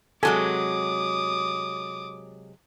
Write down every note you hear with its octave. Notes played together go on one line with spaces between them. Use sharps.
C3 F#3 G#3 A4 G#5 D6 D#6